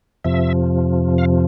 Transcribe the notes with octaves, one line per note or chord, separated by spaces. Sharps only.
F2 C3 F3 E5
F5